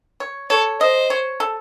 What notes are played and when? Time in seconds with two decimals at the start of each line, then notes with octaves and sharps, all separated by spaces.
0.20 C#5
0.50 A4 C#5
0.80 C5 D#5
1.10 C#5
1.40 A4